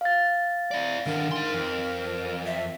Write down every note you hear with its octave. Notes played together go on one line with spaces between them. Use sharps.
F5 A6
E4 D5
D#3 D4 A#4
D#4 C6
F2
E5